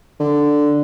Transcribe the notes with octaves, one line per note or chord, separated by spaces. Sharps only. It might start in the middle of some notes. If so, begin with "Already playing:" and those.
D3